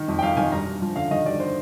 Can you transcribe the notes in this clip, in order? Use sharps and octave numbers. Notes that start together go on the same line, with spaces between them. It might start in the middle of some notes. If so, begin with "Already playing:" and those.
Already playing: D#3
F2
G5
F2 F5
D#3 G#5
G2 A#5
G2
F3
D3 F5
D#3 D#5
G2 D5
C5